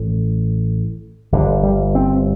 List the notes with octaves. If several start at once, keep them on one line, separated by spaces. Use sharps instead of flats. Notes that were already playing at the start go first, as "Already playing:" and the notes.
Already playing: A1 A2
G1 G2 D3
G3
C4